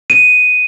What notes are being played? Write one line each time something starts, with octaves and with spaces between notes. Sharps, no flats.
D#7